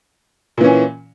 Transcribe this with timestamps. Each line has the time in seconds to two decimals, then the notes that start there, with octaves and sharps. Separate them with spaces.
0.58 A#2
0.61 E3
0.64 C#4